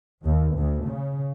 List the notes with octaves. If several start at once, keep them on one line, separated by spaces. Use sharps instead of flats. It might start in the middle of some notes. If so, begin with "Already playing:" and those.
D#2
D2
C#3